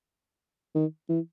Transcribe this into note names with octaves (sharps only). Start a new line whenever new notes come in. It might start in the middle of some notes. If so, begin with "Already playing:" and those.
D#3
E3